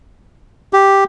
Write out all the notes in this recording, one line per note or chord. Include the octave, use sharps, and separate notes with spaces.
G4